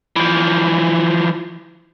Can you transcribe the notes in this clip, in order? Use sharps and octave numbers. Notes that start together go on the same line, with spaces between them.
E3 F3